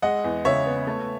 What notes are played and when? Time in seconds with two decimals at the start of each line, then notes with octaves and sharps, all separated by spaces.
0.02 G#3 D#5 F#5
0.24 E2
0.45 C#3 C#5 E5
0.66 B3
0.87 A3